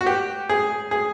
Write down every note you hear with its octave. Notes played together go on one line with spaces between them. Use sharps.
F#4
G4
G#4
G#4